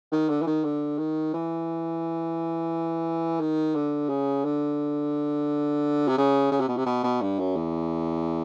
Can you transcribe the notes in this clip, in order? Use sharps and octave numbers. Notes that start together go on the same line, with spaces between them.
D#3
D3
E3
D#3
D3
D#3
E3
D#3
D3
C#3
D3
C3
C#3
C#3
C3
B2
C3
B2
B2
G2
F#2
E2